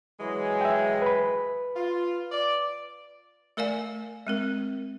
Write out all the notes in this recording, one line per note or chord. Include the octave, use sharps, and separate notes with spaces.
E3 F#3 G#3
E5 G5
B4 B5
F4
D5
A3 A#4 D5 F5 G#5
G#3 C4 A#4